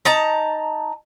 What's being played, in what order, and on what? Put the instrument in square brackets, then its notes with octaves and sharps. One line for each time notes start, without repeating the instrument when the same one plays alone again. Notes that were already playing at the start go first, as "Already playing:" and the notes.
[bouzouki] D#4 A5 A#5